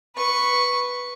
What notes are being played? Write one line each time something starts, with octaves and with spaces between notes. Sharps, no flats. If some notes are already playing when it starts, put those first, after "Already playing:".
B4 C#6